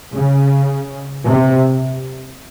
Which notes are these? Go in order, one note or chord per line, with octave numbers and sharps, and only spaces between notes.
C#3
C3